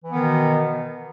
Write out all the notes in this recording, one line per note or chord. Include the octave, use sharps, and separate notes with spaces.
B2 D#3 E3 B3